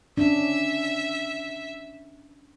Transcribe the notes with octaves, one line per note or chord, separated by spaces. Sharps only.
C#4 D4 E5